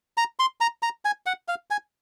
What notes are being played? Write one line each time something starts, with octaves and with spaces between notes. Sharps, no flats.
A#5
C6
A#5
A#5
G#5
F#5
F5
G#5